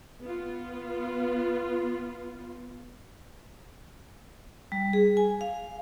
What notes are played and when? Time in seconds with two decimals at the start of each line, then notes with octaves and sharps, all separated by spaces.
0.21 B3 F4
4.72 G3
4.93 G#4
5.17 G#5
5.41 F5